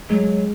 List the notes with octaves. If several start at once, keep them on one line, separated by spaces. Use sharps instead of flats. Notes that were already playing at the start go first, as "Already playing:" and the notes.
F#3 G#3